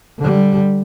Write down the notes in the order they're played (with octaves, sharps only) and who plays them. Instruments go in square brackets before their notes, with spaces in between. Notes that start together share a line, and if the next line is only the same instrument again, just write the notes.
[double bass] D3 G3